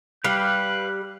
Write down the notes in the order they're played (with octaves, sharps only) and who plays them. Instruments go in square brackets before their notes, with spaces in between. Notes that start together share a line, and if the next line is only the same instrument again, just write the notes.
[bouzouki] G3 [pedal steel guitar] B4 F5 [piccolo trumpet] F#6